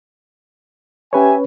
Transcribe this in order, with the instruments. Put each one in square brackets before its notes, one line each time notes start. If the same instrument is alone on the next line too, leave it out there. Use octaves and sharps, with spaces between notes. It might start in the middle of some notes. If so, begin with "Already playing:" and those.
[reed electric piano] C#4 B4 C#5 [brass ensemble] G4 E5 G#5